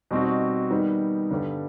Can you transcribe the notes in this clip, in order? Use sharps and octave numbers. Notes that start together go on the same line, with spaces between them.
B2 G3 C4 D#4 F#4
D#3 G3 B3
G2 D3 G3 B3